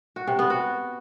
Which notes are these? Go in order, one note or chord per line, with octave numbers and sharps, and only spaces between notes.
F#4
C3
B3
F#4